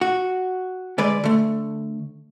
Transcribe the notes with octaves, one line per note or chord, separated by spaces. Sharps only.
F#4
D3 G#3 B4 D5
D3 A3